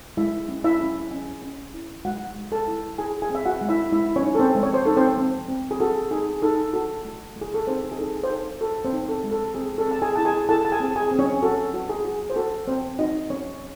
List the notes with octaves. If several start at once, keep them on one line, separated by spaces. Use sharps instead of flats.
G#3 E4 E5
C#4
E4 E5
C#4
C#4
C#4
E4
G#3 F#4 F#5
G#3
A4 A5
E4
E4 G#4 G#5
G#4 G#5
C4 E5
F#4 F#5
G#3
E4 E5
G#3 E4 E5
C#4 C#5
D#4
A4
C4 C5
G#3
C#5
C5
D#4 A4
C4 C5
C4
C4
G#4
F#4 A4
D#4 G#4
D#4 A4
F#4 A4
A3
A3
G#4
A4
C4 D#4 C5
G#4
D#4 A4
C5
D#4 A4
F#4 A4
C4 C5
D#4
A4
G#3
A4
C4 G#4
A4
C4 A5
G#4 G#5
E4 A5
G#4 G#5
E4 A4 A5
A5
G#4 G#5
C4
G#4 G#5
C4
C#4 C#5
F#4 A4
F#4
G#4
F#4
C5
F#4 A4
C4 C5
D#4 F#4 D#5
C4 C#4 C#5